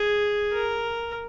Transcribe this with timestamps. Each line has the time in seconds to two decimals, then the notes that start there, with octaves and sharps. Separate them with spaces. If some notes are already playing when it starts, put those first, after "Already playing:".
Already playing: G#4
0.53 A#4